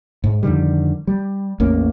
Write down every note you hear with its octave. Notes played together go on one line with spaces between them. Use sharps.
G#2
F2 D3 D#3 G3
G3
A1 E2 A#3 C#4